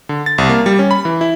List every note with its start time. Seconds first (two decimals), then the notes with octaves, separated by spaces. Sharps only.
0.09 D3
0.26 A6
0.38 C2
0.49 A#3
0.66 G3
0.79 C#4
0.91 B5
1.05 E3
1.21 E4